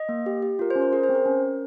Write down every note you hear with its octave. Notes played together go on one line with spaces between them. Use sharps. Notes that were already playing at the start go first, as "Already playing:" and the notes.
Already playing: D#5
A#3
G4
G4
F4 A#4
C5
C#4
A#4
G#4 A#4
C5
C4
A#4
C#4
C#4